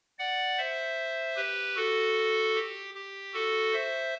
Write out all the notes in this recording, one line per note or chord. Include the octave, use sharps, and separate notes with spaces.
D5 F#5
C5 E5
G4 B4
F#4 A4
G4
G4
F#4 A4
C5 E5